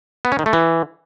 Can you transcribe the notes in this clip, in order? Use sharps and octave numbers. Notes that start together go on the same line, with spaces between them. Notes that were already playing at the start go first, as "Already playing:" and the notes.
B3
C#4
D#3
A3
E3